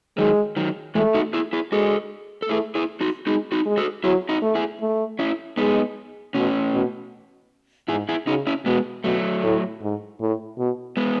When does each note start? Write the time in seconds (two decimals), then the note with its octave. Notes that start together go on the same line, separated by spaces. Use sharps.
0.18 D#3 F#3 G#3
0.57 D#3 F#3
0.95 E3 G#3 A3
1.14 D#4 F#4
1.33 E4 G#4
1.53 E4 G#4
1.72 G#3 F#4 A4
2.42 A4
2.49 A3 E4 G#4
2.75 E4 G#4
3.01 D#4 F#4
3.27 G#3 D#4 F#4
3.52 D#4 F#4
3.66 G#3
3.78 F#4 A4
4.04 F#3 E4 G#4
4.29 D#4 F#4
4.42 A3
4.55 E4 G#4
4.81 A3
5.19 C#4 E4
5.57 G#3 B3 D#4
6.35 B2 A3 C#4
6.74 B2
7.88 G#2 E4 G#4
8.09 E4 G#4
8.27 C#3 D#4 F#4
8.47 C#4 E4
8.66 B2 G#3 B3
9.04 B2 F#3 A3
9.43 A2
9.81 G#2
10.21 A2
10.58 B2
10.97 G#3 B3